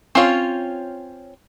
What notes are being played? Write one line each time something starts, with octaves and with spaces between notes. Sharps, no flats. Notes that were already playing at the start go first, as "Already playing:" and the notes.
C4 C#4 F4 C#5